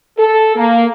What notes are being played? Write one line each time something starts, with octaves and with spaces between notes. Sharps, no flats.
A4
A#3